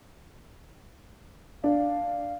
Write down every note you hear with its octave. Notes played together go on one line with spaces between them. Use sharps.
D4 F5